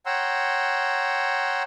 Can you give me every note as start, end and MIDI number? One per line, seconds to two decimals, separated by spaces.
0.06 1.63 73
0.06 1.63 78
0.06 1.63 79
0.06 1.63 82
0.06 1.63 84
0.06 1.63 88